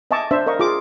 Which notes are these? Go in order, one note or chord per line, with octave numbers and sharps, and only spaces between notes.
D#5 E5 G#5 A5 C#6 D6
D4 C5 E5
A#4 D#5 F5 C#6
F4 G#4 D6